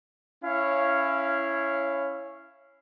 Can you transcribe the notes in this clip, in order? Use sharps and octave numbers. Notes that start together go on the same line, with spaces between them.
C#4 E4 C#5 F5